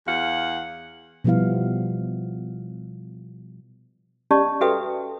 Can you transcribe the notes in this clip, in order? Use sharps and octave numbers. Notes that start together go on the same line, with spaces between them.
E2 F5 F#5
B2 F3 G3 B3 E4 F5
C#4 G4 D5 D#5 A5 C#6
F#4 A4 B4 E5 G5 D#6